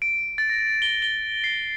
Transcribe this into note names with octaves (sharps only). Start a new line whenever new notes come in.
D7
A6
A#6
G7
G7
C7